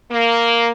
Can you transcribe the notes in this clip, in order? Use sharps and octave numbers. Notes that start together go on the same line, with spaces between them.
A#3